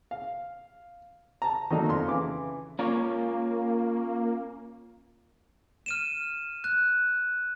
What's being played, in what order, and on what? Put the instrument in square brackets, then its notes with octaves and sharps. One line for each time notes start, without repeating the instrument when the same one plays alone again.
[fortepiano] F5
A5 A#5
D#3 F#3 A3 A#3 D4 D#4
F2 C6
C#3 E3 D6
[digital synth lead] A#3 [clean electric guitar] C#4 F4 C#5
[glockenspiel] F6 D#7 E7
F#6